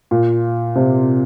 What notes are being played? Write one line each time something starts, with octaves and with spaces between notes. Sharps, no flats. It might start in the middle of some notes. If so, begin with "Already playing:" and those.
A#2
C3